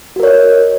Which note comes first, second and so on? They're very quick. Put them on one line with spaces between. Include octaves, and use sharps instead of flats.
F#4 A#4 C#5 D#5